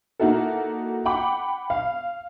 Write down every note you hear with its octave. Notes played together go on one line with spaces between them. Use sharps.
A#3 D#4 E4 F#4 A4
F#5 G5 B5 D6
F5